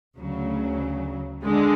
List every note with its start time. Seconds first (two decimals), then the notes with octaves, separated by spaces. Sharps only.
0.17 D2 C#3 F#3
1.44 D3 G#3